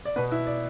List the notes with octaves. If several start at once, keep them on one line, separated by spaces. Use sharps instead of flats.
D5
B2 B3 B4
E4
D5